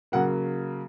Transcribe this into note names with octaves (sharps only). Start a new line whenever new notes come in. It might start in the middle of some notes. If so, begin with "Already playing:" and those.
C#3 F#3 A#3 F#5